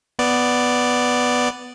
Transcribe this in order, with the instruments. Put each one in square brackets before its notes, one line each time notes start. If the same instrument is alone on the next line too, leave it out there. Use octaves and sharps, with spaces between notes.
[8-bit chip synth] B3 D5